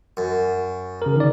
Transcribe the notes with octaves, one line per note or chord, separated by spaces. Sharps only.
F#2
C#3 A#4
D#3 D5